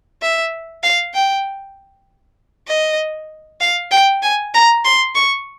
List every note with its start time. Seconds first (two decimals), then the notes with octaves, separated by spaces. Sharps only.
0.22 E5
0.83 F5
1.14 G5
2.68 D#5
3.61 F5
3.91 G5
4.23 G#5
4.54 A#5
4.85 C6
5.15 C#6